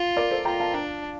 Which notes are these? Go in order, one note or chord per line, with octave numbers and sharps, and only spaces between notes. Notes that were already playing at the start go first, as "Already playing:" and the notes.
Already playing: F4
A#4 D5
A4 C5
F4 G5 A#5
F5 A5
D4